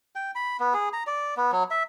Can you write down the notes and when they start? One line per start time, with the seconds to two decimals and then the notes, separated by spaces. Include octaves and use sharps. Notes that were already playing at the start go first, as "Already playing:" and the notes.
0.16 G5
0.35 B5
0.60 B3
0.74 G#4
0.93 A#5
1.07 D5
1.37 B3
1.52 F#3
1.71 E5